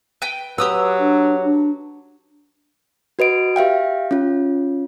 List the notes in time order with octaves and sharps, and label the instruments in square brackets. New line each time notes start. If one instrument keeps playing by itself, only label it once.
[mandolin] B4 G5
[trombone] F#3 [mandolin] G4 D#6 E6 [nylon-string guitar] B4
[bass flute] D4
D4
[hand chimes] F#4 B4 D#5 D7
G4 E5 F5 G5
C#4 F4